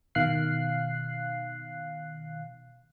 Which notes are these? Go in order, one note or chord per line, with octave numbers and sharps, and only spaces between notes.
B2 D#3 F5 F#6 C7